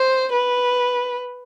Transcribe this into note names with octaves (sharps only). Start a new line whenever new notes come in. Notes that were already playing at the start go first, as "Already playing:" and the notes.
Already playing: C5
B4